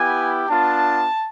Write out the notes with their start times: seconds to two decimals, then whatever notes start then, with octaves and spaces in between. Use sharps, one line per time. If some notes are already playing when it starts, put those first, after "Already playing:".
Already playing: B3 E4 G4 G#5
0.48 B3 D4 F4 A5